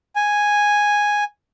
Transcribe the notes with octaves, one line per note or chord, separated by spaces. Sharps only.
G#5